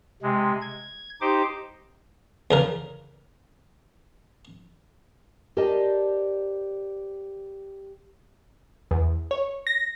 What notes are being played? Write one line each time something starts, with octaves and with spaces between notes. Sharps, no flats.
C3 G#3
G#6
D#4 G4 C5 D6
E2 C#3 A#4
G4 A#4 C5 D5 D#5 A5
E2
C#5
A#6